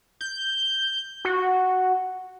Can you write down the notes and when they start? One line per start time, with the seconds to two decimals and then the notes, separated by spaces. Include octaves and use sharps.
0.21 G6
1.25 F#4